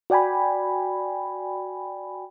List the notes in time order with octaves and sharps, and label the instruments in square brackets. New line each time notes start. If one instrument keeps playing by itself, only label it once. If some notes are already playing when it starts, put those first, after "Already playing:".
[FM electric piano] F#4 D5 G5 G#5 B5